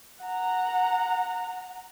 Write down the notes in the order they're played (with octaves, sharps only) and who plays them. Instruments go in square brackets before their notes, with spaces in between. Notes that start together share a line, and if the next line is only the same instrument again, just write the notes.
[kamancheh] F#5 A#5